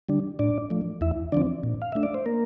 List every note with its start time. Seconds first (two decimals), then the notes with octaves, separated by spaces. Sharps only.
0.09 D3 G3 D4
0.39 A2 D4 D5
0.70 F3 A3
1.01 E2 E4 E5
1.32 D3 F3 C4 D4 D5
1.63 A#2
1.82 F5
1.92 A3 D4 E5
2.03 D5
2.14 C5
2.26 A#3 A#4